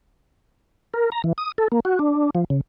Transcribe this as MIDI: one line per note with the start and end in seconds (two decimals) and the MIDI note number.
0.94 1.10 70
1.12 1.22 82
1.24 1.33 52
1.38 1.52 87
1.58 1.68 69
1.72 1.80 58
1.85 1.99 66
1.99 2.30 62
2.35 2.44 53
2.50 2.61 49